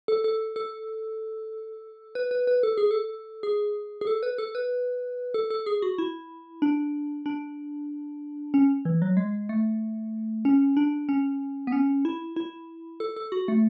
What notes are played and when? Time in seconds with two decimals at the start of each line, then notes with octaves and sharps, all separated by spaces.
0.08 A4
0.24 A4
0.56 A4
2.15 B4
2.31 B4
2.47 B4
2.63 A4
2.78 G#4
2.91 A4
3.43 G#4
4.01 G#4
4.07 A4
4.23 B4
4.38 A4
4.55 B4
5.34 A4
5.50 A4
5.66 G#4
5.82 F#4
5.98 E4
6.62 D4
7.26 D4
8.54 C#4
8.85 E3
9.02 F#3
9.17 G#3
9.49 A3
10.45 C#4
10.77 D4
11.09 C#4
11.67 B3
11.72 C#4
12.05 E4
12.36 E4
13.00 A4
13.16 A4
13.32 F#4
13.48 A3